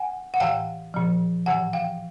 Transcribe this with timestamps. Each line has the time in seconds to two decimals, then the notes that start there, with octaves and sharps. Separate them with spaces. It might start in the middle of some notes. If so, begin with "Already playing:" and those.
Already playing: F#5 G#5
0.34 F#5
0.40 A2 E3 F5 G5
0.94 A#2 F3
1.46 A2 E3 F#5 G#5
1.73 F5 G5